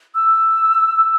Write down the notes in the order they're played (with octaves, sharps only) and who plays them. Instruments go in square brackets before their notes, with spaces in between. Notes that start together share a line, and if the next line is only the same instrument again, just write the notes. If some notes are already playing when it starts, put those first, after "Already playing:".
[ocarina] E6